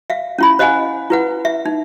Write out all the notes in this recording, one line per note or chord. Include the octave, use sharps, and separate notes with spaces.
E5 F5
C#4 E4 B5
C5 D#5 F5 F#5 G#5
E4 B4 F#5
E5
D#4